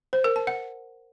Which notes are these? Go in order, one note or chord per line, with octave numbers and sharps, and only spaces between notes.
C5
A#4
A5
F#5